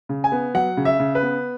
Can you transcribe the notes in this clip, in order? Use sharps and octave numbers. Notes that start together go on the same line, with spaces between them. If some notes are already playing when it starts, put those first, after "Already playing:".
C#3
G#5
B3
F#3 F#5
C#3
E5
C#3
B4
B3